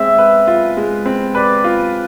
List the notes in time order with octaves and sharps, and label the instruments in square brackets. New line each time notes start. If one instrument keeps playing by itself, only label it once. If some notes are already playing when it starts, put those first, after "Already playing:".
Already playing: [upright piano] G#3 C4 [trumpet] E5
[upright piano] B4
F4
G#3
C4
[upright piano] B4 [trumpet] D5
[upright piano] F4